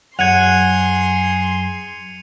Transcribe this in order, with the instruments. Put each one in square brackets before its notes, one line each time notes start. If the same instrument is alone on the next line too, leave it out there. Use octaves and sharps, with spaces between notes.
[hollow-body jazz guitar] F#2 [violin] G#4 C6 [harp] F#5 G#6 [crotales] C#7 D#7 F7